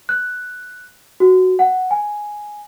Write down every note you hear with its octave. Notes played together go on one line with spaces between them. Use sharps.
F#6
F#4
F#5
G#5